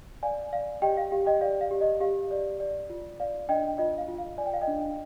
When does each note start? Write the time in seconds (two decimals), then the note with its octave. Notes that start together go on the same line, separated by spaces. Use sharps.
0.23 D5 F5 G#5
0.53 D5 F5
0.82 G4 D#5 G5
0.97 F5
1.12 G4 F5
1.26 D#5 G5
1.41 D5 F5
1.61 F5
1.71 G4
1.81 D#5
2.00 G4 F5
2.31 D5
2.60 D5
2.90 F4
3.20 D5 F5
3.49 D4 D#5 G5
3.78 F4 D#5
3.98 F5
4.08 F4
4.18 F5
4.38 D5 G#5
4.46 G5
4.54 F5
4.61 D#5 G5
4.68 D4